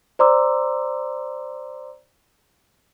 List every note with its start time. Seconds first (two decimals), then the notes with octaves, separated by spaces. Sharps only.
0.19 C5 D5 A#5 C6 D6 E6